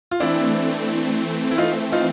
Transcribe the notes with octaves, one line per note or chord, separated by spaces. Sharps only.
F4
E3 A3 C4 D4 E4
E4
D#4 F4
D#4 F4